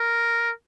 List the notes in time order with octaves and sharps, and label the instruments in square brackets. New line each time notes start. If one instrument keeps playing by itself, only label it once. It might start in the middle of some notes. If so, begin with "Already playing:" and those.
Already playing: [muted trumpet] A#4